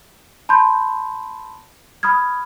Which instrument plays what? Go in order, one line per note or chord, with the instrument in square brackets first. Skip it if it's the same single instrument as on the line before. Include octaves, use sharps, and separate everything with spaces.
[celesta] A5 B5 C6 G6
B5 D#6 F6 G#6